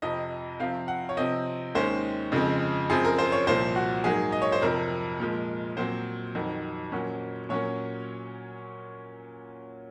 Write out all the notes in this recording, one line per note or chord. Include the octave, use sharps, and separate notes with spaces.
F2 C3 F3 D#5
C3 F3 C4 F5
F#5
C#5
C3 F3 C4 D#5
D#2 D#3 G#3 C#4 C5
F2 C#3 F3 G#3 C4
F#2 F3 C4 G#4
A#4
C5
C#5
C2 A#2 F3 C5
F#4
G#2 F#3 A#3 G#4
D#5
C#5
C5
F2 C3 F3 A#4
A#2 F3 G#3
A#2 F#3 C4 C5
F2 D#3 F#3
A#2 F#3 A#3 C#4
A#2 F#3 A#3 C#4 C#5